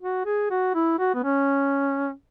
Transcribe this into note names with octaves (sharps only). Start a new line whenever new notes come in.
F#4
G#4
F#4
E4
F#4
B3
C#4